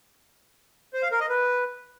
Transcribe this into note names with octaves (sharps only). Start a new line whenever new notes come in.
C5
F5
A#4
D#5
B4